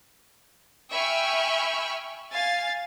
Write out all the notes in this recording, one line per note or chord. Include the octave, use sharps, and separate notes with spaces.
E5 G5 G#5 B5 C#6 F6
F5 G#5 A6